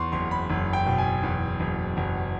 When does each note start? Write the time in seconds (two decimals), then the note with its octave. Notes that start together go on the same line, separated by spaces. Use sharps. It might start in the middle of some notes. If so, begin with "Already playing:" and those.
Already playing: E2 C6 C#6
0.12 F#1 C6
0.31 B5
0.50 F#1
0.73 G5
0.86 B2
0.98 G#5
1.23 E2
1.60 F#1
1.97 F#1